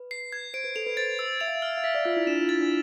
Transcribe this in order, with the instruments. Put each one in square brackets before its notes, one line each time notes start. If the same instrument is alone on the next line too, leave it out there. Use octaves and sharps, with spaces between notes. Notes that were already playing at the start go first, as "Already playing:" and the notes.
Already playing: [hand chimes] B4
[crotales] C7
G#6
[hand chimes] C5 [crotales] D7
[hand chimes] B4
[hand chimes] A4 [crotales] F7
[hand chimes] B4
[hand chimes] C5 [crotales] A6
[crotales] E6
[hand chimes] E5 [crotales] F7
[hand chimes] F5
E5
[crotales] F6
[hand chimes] F5
[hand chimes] E5 [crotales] B6
[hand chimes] D5
[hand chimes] F4 [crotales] F6
[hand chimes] E4
[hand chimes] D4 [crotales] E7
[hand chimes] F4
[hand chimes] E4 [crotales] A6
[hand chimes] D4